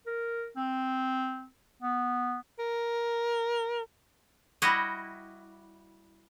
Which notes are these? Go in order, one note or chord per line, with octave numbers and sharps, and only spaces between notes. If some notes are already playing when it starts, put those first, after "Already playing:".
A#4
C4
B3
A#4
G3 E4 F#4 D#5